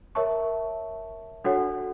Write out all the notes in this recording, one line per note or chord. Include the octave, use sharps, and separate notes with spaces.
A#4 C#5 E5 A5 C#6
D4 F#4 A4 C#5 F#5